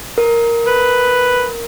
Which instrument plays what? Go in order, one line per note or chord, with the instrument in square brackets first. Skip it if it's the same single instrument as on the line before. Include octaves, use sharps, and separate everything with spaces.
[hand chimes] A#4
[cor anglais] B4